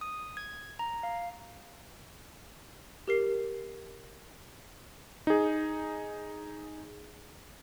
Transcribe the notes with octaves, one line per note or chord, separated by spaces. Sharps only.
D#6
G#6
A#5
F5
G4 A#4 C7
D#4 G#4